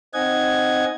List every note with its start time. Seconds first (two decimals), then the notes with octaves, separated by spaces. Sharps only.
0.14 C4 D#4 D#5 F#5 G#5 G#6